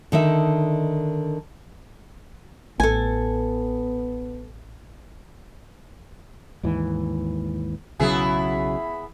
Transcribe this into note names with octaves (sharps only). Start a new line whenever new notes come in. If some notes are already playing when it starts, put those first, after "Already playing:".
D3 D#3 D#4 E5
A1 B3 A4 G#5
D#2 G#2 E3
B1 C#3 F#3 B3 E4 G#4